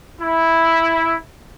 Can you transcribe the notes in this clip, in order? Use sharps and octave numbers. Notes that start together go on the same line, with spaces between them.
E4